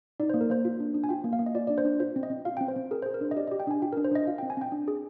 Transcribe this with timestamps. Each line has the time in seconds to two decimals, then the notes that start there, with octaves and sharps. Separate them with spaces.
0.20 D#4 D5
0.30 A#3 C5
0.41 A#4
0.50 A#3 C5
0.65 F4
0.80 D4
0.94 D4
1.04 G#5
1.09 F4 G5
1.24 A#3
1.33 F5
1.39 A#3
1.46 D#5
1.55 F4 D5
1.67 D4 D5
1.78 C5
1.85 D4
2.00 F4 C5
2.16 C4
2.23 D#5
2.30 C4
2.45 F4 F5
2.57 C4 G5
2.68 C5
2.76 C4
2.91 G#4 A#4
3.02 G#4 C5
3.14 A#4
3.21 D4 C5
3.31 D#5
3.36 G4 D5
3.47 G4 D#5
3.60 G5
3.67 D4 G#5
3.82 F4 G5
3.93 D4 A#4
4.04 C5
4.11 D4 D#5
4.27 F4 F5
4.38 C4 G5
4.50 G#5
4.57 C4 G5
4.72 D4
4.88 G#4